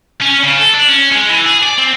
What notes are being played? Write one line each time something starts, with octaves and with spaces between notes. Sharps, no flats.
C#4
C#3
A4
D4
C#4
G#3
E3
G#4
D5
C4